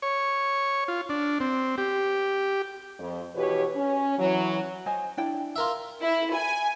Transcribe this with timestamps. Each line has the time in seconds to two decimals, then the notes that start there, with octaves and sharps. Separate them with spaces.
0.02 C#5
0.88 F4
1.09 D4
1.40 C4
1.78 G4
2.99 F2
3.35 B2 E3 F#4 G4 B4 C#5
3.76 C#4
4.19 E3 F#3
4.86 C5 D#5 G#5
5.17 D4 E4 G5
5.56 F4 A#4 E5
6.02 E4
6.35 G#5